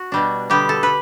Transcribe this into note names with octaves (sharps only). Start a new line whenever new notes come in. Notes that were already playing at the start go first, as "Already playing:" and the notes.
Already playing: F#4
B2 G3 D4
D3 G3 B3 G4
A4
B4